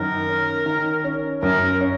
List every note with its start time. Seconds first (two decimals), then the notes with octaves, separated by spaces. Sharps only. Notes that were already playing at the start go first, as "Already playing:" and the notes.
Already playing: F#2 D#3 A#4
0.28 C#4
0.66 D#3
1.04 C#4
1.43 F#2 A#4
1.81 C#4